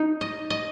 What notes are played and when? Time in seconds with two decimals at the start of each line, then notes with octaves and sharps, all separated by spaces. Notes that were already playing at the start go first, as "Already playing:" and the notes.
Already playing: D#4
0.21 D#5
0.50 D#5